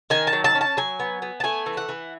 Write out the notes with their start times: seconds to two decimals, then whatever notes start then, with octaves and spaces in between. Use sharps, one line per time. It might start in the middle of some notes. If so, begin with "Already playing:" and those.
0.10 D#3 G#5
0.27 A5
0.33 F#3
0.44 A5
0.55 C#4
0.61 A5
0.77 F#3 G#5
1.00 B3
1.22 B3
1.40 A5
1.44 A3 G#5
1.66 E3
1.77 F#5
1.89 E3